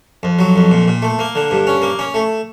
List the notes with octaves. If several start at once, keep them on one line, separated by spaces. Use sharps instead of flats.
F2
F#3
F2
A#2
A#2
A3
A#3
D3
G2
C#4
A#3
C#4
A3